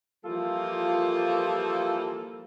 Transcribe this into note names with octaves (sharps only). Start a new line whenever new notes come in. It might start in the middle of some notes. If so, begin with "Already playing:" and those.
E3 F3 G3 A#3 F4 A4